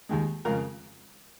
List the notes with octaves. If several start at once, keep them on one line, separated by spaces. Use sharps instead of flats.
D#2 D#3 G#3
F2 C#3 G#3 A#4